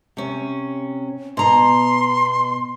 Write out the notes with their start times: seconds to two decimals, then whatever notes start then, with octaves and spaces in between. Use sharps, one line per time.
0.17 C3 C#4
1.37 B2 A#5 C6